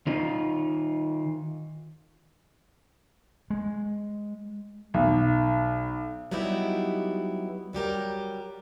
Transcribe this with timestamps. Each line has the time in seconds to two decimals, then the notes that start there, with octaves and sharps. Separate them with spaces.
0.07 D#3 D#4 F4
3.50 G#3
4.94 B1
6.31 F#3 G3 B3 D#4 E4 G4
7.73 F#3 G3 G4 A#4